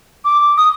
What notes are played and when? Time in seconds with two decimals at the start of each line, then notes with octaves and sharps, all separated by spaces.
0.25 D6
0.58 D#6